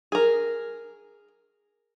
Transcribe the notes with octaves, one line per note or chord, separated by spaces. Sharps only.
G#4 A#4